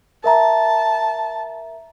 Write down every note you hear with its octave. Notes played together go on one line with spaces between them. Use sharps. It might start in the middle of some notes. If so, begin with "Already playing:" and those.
A#4 E5 A5 A#5